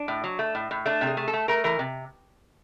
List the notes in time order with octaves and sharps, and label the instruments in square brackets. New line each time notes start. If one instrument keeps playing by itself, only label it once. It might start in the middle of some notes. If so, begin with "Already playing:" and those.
Already playing: [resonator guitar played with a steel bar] D4
A2
F#3
A3
A2
A2
A3 D4
C3
G#4
A3
A4
A3
A3 A#4
E3 A#4
C3